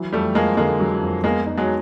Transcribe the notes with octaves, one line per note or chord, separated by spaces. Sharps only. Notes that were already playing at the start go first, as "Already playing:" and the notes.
Already playing: E3 F#3
F2 G3 A3
F2 G#3 A#3
D3 G#3 A#3
F#3
F2
G#3 A#3 B3
D#4
F#3 G#3